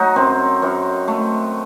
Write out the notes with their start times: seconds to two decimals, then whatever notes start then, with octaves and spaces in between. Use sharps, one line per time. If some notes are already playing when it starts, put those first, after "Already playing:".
Already playing: F#3 A3 D#4 F#4
0.16 F#2 C4
0.62 F#2
1.08 A3